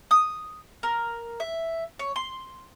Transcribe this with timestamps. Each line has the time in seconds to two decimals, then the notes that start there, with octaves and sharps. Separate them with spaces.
0.11 D#6
0.83 A#4
1.40 E5
1.99 C#5
2.16 C6